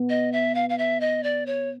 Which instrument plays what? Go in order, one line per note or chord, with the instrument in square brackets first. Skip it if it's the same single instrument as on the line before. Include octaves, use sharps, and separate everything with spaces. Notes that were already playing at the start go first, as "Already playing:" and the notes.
Already playing: [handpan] B3
[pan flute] D#5
E5
F5
F5
E5
D#5
D5
C#5